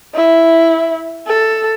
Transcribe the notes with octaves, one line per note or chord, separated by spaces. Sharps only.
E4
A4